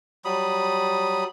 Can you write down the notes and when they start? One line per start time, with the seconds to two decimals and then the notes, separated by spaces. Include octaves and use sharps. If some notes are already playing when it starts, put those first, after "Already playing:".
0.25 F#3 G3 B5 D#6